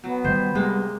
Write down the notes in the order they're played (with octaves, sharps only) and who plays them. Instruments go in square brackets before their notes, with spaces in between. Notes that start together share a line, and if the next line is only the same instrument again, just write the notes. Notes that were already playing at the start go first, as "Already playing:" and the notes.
[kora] F#3 [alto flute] B3
[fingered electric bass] D#3 G3 [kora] C5
[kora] C3 G#3 A#3 [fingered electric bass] G3